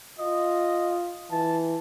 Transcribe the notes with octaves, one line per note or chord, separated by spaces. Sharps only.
F4 D#5
E3 A5